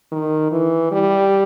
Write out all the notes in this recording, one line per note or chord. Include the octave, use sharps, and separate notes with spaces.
D#3
E3
G3